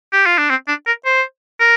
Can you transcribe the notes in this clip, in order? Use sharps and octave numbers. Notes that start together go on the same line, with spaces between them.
G4
F4
D4
C4
D4
A#4
C5
A#4